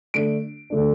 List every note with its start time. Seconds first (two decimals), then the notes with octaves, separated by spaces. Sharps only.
0.14 D3 A3 D4 D7
0.70 D3 A3 D4